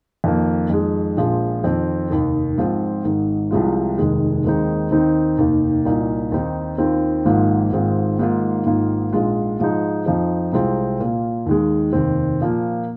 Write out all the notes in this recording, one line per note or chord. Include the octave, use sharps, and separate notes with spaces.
F2 D#3 A#3
F2 D#3 G#3
A#1 A#2 F3 G#3 F4
F2 D#3 C4
F1 D#2 D#3
G#2 F3 C4 F4
G#1 G#2 D#3
C2 C3 F3 G#3 F4
F1 D#2 D#3 G#3
D#2 D#3 G#3 C4 D#4
D#2 D#3 C4 D#4
F1 D#2 D#3 A#3
C2 A#2 A#3 D#4
D#2 D#3 C4 D#4
D#2 D#3 C4 F4
G#1 G#2 F3 A#3 F4
G#1 G#2 G#3 C4 F4
G#2 D#3 A#3 F4
G#1 G#2 D#3 A#3 F4
A#1 G#2 G#3 F4
G#2 F3 G#3 D#4
F2 F3 C4 D#4
C2 C3 G#3 C4 F4
A#2 A#3 F4
D#2 D#3 G#3
F1 D#2 D#3 C4
A#2 F3 A#3